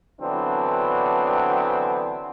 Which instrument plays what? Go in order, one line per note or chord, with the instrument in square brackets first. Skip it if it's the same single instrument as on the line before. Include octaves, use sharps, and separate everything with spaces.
[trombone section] D3 E3 F#3 B3 C4 D4